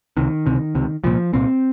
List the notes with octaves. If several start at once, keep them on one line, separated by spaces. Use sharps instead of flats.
C#2 C3 D#3
C#2 C3
C#2 C3
C2 A#2 F3
C2 A#2 C4